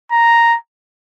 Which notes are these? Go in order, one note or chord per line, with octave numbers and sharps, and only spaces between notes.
A#5